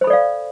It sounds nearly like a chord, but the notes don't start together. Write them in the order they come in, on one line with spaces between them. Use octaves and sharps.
C5 B5 A4 D5 F5